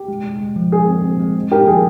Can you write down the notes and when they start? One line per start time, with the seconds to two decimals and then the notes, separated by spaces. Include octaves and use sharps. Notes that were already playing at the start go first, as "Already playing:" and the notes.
Already playing: G4
0.08 G#3
0.24 G#3
0.41 G#3
0.56 F3
0.72 G#3 G#4
0.88 C4
1.04 C4
1.20 G#3
1.35 G#3
1.51 D#4 G4 A#4
1.67 F3 G#4